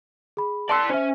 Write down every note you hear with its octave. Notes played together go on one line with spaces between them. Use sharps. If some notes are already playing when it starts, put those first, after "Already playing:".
G#4 B5
D5 A5 C6 E6
C#4 C5 E5